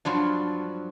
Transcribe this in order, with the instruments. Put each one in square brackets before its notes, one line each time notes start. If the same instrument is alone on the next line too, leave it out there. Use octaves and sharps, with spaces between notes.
[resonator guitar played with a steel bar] G2 F3 F#3 D4